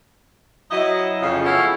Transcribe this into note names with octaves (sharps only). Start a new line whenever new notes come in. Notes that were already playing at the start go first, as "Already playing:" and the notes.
F#3 E4 D#5
F2 C#3
B3 E4 G#4 A4 C#5 F5